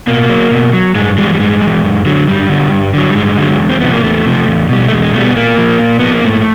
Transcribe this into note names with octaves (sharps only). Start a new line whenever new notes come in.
B2 A#3
F#3
B2
F#3
G2 G#3
E3 G3 G#3
G3
G2 G#3
G3
E3
F#2
D3 F#3
F#2 G3
D3 F#3
G2
D3 F#3
G3
G2 G#3
D3 F#3
E2
C4
C3 F3 B3
A#3
E2 A3
C3 F3
E2
B2 G3
A3
E2 G#3
G#3
B2 G3 A3
B3
A#2 A#3
F3
A#2
F3 B3
A#3
G#2 A3